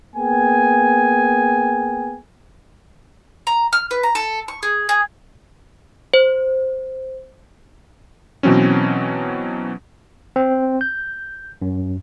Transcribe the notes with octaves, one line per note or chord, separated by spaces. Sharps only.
A#3 B3 G#4 G5 G#5
A#5
F6
B4
A#5
A4
C#6
G#4
G#4
C5
B2 E3 F#3 C4 C#4
C4
G6
F#2